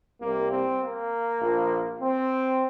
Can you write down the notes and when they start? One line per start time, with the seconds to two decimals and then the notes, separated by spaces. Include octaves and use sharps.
0.21 C2 C3 G3 A#3
0.51 C4
0.81 A#3
1.41 A#1 A#2 F3
2.01 C4